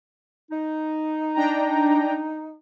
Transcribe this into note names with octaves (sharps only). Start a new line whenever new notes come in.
D#4
D4 G5 A#5